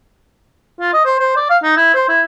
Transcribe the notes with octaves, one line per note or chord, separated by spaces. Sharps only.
F4
D#5
C5
C5
D5
F5
D#4
E4
C5
E4